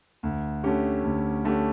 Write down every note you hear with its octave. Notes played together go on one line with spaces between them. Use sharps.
D2
D3 A3 C#4 G4
D2
D3 A3 C#4 G4